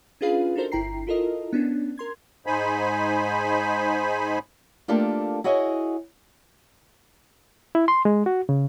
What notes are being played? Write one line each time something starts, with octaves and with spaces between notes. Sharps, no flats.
C#4 D4 F4 G#4 B4 F5
D4 D#4 F#4 A4 A#4 C5
G1 E4 G5 A#5 C7
E4 F4 A4 A#4 D#5
B3 C#4 D4
A#4 C6 G#6
G#2 D#4 C5 G#5 B5
A3 A#3 D4 F4 G4 A4
E4 F#4 G#4 C#5 D#5
E4
C6
G#3
F#4
C#3